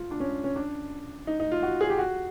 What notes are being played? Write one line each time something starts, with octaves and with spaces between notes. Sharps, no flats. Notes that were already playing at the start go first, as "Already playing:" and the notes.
Already playing: F4
D4
C#4
C#4
D4
D#4
D#4
F4
F#4
G#4
G4
F#4